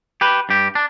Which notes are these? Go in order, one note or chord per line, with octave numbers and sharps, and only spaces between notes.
G4 B4
G2 G4
D4